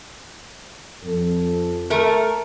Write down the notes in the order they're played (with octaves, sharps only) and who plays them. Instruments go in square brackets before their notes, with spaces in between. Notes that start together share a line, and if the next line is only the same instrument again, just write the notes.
[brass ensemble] F2 A4
[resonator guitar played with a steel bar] A3 A#4